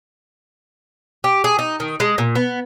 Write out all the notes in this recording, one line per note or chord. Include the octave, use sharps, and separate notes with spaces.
G4
G#4
D#4
D#3
G#3
A#2
B3